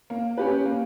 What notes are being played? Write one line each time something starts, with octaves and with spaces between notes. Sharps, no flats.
A#3
C#4 G4 B4
A#3